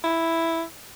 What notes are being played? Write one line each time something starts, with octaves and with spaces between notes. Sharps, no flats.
E4